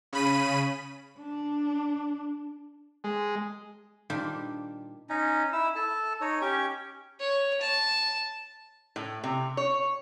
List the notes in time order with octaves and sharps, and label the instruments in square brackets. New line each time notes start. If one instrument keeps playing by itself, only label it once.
[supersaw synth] C#3 B5 D#7
[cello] D4
[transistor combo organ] G#3
[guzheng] A#2 D#3 G3 D4 G4 C5
[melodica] C#4 D#4
E4 E6
A4 A5
D#4 C#5
C#4 G4 C#6
[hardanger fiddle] C#5
A5
[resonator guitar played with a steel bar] A2
C3
C#5